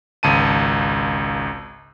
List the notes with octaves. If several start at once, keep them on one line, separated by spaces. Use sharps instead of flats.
G#1 C#2 A5 D#7